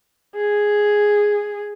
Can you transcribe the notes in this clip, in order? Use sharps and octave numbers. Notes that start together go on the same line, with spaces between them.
G#4